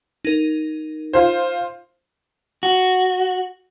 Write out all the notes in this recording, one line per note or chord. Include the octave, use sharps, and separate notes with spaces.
D#4 A#4
F4 C5
F#4